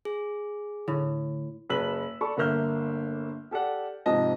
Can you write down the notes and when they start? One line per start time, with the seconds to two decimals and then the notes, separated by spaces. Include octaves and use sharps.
0.05 G#4
0.88 A2 D3
1.69 F#1 B4 E6 B6 F#7
2.21 A4 D5 B5 C#6
2.37 G1 D3 A#3 E5 F6 G6
3.51 G4 A4 D5 F#5
4.06 G#2 C3 F3 D#5 A5